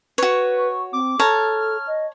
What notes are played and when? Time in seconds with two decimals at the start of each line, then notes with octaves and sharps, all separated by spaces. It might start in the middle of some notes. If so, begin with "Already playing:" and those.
0.18 F#4 B4 C#5
0.58 C#6
0.93 C4 D6
1.19 A4 C#5 A5 A#5 F6
1.87 D#5